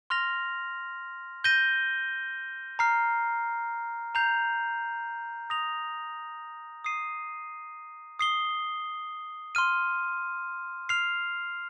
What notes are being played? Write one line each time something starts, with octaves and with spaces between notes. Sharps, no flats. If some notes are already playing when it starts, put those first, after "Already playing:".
C6 F6 A#6 F7
G6 A#6 D#7 G7
A#5 F6 C7
A#5 G6 C7 F7
D#6 A#6 F7
D#6 C7 D#7
D#6 C7 G7
C6 F6 D#7
F6 C7 F7